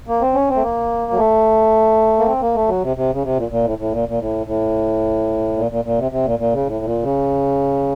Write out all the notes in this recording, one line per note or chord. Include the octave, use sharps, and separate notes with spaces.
A#3
C4
C#4
C4
A3
A#3
F#3
A3
A#3
C4
A#3
A3
F#3
C3
C3
C#3
C3
A#2
A#2
A2
A2
A#2
A#2
A2
A2
A#2
A#2
A#2
C3
C3
A#2
A#2
C#3
A2
A#2
C#3